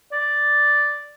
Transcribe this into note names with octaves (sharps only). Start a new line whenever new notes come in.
D5